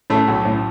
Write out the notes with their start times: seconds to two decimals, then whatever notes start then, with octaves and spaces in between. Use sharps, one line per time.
0.10 A2 A3
0.28 B1
0.45 A2